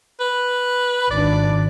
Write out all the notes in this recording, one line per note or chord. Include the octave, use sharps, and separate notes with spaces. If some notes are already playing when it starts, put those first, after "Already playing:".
B4
G#1 D4 D5